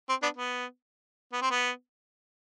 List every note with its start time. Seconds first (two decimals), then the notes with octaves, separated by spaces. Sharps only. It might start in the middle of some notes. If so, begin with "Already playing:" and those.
0.09 C4
0.23 B3 D4
0.36 B3
1.33 B3
1.42 C4
1.51 B3